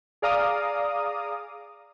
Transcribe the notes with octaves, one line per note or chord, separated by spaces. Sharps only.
G#4 D5 F5 A#5 D6 D#6